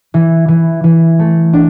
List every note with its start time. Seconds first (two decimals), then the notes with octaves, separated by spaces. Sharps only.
0.14 E3
0.48 E3
0.84 E3
1.19 A3
1.53 D4